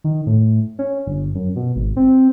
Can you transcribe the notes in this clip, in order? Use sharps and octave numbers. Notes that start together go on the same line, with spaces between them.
D#3
A2
C#4
G1
F#2
B2
G#1
C4